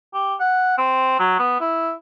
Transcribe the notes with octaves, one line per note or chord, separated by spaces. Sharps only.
G4
F#5
C4
F#3
B3
E4